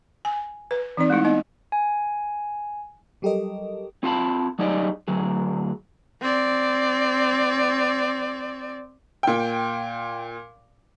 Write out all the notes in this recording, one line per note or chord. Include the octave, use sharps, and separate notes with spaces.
G#5
B4
E3 C4 D#4 D5
G#3 A3 D#4 E4
B3 D#4 D#5
G#5
F#3 G3 G4 A4 A#4 D#5
C4 F4 F5 A5 B5
F#3 G3 D#4 G#4 D5 D#5
D2 F#3 G#4
C4 D5
A#2 G5